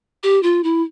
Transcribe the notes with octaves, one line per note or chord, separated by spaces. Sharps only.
G4
F4
E4